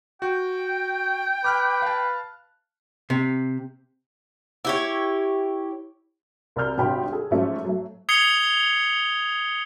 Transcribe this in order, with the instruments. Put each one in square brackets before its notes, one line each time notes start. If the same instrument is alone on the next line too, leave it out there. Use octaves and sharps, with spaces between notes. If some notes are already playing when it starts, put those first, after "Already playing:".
[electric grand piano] F#4 [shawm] G5
[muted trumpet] B4 [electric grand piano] D6 F6 F#6
[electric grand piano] F5 A5
[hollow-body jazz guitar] C3
[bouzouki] E4 G4 C#5
[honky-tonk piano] C2 A#4 D5 F6 G6
G#1 G2 C3 G5 B5 C6
G#4 A4
G#2 F3 F#3 A3 C#4
F#3 A3
[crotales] D#6 G#6 C7 C#7 F7 G7